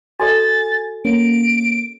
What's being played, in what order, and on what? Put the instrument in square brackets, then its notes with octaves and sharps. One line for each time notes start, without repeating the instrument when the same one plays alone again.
[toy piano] F#4 A4 D#5 [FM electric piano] G#5 [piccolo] A6
[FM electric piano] A#3 C#4 [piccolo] D7